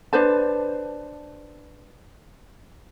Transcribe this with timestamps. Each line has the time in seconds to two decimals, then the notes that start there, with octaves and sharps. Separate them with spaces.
0.13 D4 B4 C5 A5